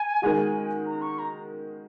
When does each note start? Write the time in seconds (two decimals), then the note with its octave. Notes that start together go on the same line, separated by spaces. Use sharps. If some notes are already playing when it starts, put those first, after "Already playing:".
Already playing: G#5
0.22 D#3 G#3 F#4
0.86 A#5
1.01 C#6
1.19 A#5